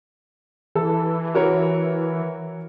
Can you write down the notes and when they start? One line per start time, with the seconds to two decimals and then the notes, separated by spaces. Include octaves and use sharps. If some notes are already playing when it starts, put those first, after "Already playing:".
0.75 E3 A4
1.35 F#4 A#4 C#5